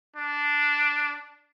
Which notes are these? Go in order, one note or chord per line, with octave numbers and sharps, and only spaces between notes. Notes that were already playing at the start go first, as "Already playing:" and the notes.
D4